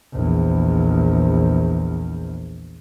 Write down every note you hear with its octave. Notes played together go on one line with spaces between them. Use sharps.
A#1 E2